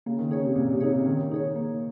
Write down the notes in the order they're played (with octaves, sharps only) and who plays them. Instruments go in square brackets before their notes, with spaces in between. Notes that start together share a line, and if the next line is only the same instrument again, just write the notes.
[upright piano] C#3 [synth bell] A#3
[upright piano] D#3
[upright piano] C#3 [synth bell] D#4 G#4 C#5
[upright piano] C3
[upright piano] A#2 [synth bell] A#3
[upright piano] C3
[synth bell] D#4 G#4 C#5
[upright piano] C#3
[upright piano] D#3 [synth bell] A#3
[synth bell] D#4 G#4 C#5
A#3